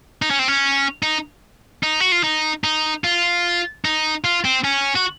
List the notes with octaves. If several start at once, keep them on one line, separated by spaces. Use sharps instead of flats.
D#4
C#4
C4
C#4
D#4
D#4
F#4
F4
D#4
D#4
F4
D#4
F4
C4
C#4
F#4